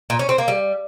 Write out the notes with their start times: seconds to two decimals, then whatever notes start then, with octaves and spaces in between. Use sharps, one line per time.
0.10 A#2
0.19 C#4
0.29 C4
0.38 A#3
0.48 G3